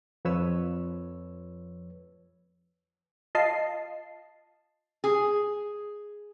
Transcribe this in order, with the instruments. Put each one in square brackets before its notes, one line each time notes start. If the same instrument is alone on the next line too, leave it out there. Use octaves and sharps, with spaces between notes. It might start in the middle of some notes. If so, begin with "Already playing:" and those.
[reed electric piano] F2 F3 B4 C#5 E6
[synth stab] F4 D#5 A5 C7
[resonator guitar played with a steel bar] G#4